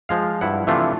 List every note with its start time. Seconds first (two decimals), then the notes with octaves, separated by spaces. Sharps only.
0.09 F3 G#3 F5
0.41 G2 E4 F#5
0.67 C3 E3 F3 A3 D4 F4